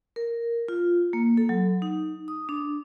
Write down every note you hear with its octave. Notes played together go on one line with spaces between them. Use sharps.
A#4
F4
A#3
A4
F#3
D#4
D#6
D4